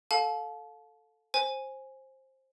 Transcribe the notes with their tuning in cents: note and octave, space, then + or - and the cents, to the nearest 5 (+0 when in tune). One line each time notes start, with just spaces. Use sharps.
A4 +0 F5 +30 A5 -30
C5 +15 G#5 +0